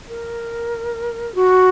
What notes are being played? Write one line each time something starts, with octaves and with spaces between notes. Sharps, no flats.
A#4
F#4